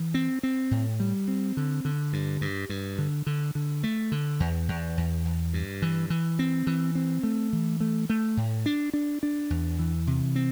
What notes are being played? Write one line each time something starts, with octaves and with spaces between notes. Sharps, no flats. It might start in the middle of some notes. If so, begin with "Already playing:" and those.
Already playing: E3
C4
C4
A2
G3
C4
D3
D3
G2
G2
G2
D3
D3
D3
A3
D3
E2
E2
E2
E2
G2
E3
E3
C4
E3
C4
A3
E3
A3
A3
A2
D4
D4
D4
E2
E3
C3
C4